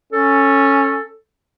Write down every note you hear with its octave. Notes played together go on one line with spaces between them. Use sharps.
C#4 A4